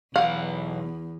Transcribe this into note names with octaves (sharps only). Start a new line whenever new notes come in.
B1 E2 F5 F#5